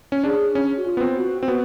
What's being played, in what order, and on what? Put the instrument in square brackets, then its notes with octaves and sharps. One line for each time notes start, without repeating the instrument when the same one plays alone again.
[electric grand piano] C#4
[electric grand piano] D4 [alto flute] G#4
[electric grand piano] C#4
[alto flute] F#4
F4
[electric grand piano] B3
C4
[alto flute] F#4
[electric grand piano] C4
[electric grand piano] B3 [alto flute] F#4